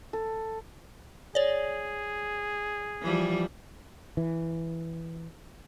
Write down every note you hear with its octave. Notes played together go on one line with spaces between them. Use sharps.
A4
G#4 C#5 D5
E3 F3 G3
E3